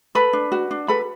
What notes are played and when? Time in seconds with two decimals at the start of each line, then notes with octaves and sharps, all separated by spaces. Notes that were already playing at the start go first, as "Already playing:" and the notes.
0.15 A4 B4 B5
0.33 D4
0.52 F#4
0.71 D4
0.88 A4 B4 B5